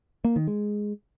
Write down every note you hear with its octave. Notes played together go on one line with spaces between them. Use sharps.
A#3
D#3
G#3